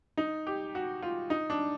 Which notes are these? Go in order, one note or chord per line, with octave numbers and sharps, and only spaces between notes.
D#4
G4
F#4
F4
D#4
D4